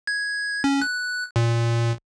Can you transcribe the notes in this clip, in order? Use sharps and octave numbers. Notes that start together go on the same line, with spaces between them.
G#6
C#4
F#6
A#2